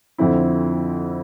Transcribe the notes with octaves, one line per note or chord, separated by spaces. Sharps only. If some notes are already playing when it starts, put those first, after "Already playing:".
F2 D3 F3 C4 E4